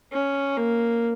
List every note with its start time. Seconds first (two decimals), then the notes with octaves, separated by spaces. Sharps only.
0.12 C#4
0.57 A#3